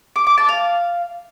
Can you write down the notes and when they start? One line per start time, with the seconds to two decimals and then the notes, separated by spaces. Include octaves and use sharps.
0.16 D6
0.27 D6
0.38 A5
0.49 F5